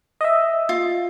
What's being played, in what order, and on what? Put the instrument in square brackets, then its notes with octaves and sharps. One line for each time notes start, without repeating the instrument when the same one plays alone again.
[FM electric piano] D#5 E5
[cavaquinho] F4